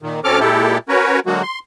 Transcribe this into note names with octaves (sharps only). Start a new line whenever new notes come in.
A#2 D#3
D2 C4 C#4 A4 D6 F6
A#2 G#3 E4 G4 A4
C#4 F#4 A#4 B4 C#5
D3 F#3 G#3 A#3 F#4
C6